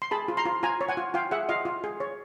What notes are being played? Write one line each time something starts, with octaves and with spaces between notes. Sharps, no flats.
C6
G#4 A5 B5
F4
A#5 C6
F4
F4 G#5 A#5
C#5
F#5 G#5
F4
F4 F5 G5
G#4 E5 F#5
F4 D#5 F5
F4
G#4
C#5